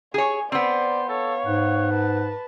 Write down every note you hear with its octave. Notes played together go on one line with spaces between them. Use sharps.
G#4 C#5 G#5
B3 C4 C5 D5
A4 C#5 F5
G#2 F#5
B4 A5